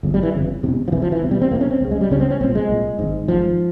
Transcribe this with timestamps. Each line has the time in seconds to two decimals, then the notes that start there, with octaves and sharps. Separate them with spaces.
0.03 G1 F2 C#3
0.14 G3
0.23 E3
0.34 G1 F2 C#3
0.63 E1 E2 C3
0.88 F3
0.92 E1 E2 C3 E3
1.02 F3
1.12 E3
1.22 E1 E2 C3
1.31 G3
1.41 C4
1.51 E1 E2 C3 A#3
1.61 C#4
1.71 C4
1.81 C#2 C#3
1.91 G#3
2.01 G3
2.10 C#2 C#3 C#4
2.20 C4
2.30 C#4
2.41 C2 A#2 C4
2.55 G#3
2.69 C2 A#2
2.99 G#1 G#2
3.28 G#1 G#2 F3